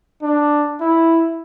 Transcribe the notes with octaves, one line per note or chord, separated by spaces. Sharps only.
D4
E4